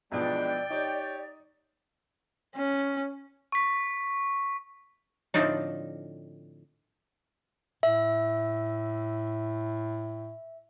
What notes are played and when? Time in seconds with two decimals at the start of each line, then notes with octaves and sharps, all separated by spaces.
0.12 B1 B2 E3 F3 G#3 D4 D5 G5
0.70 D#4 G4 C#5
2.56 C#4
3.52 C#6 B6
5.34 A2 D3 F3 C4 D4 D#4
7.83 A2 E5